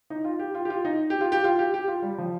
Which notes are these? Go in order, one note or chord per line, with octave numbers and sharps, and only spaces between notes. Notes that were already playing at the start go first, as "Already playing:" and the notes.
D#4
F4
G4
F4
G4
F4
D#4
G4
F4
G4
F4
G4
G4
F4
G3
F3